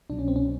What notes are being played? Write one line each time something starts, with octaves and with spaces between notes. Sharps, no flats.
C2 B2 F#3 D4
C#4
C4
C#4